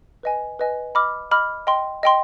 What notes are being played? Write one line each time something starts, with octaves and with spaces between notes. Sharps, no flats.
B4 D#5 G#5
B4 D#5 G#5
D#5 B5 D6 F6
D#5 B5 D6 F6
D#5 G5 C6
D#5 G5 C6